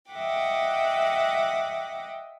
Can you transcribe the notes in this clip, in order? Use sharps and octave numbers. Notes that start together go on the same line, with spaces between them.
D#5 E5 F#5 G5 D6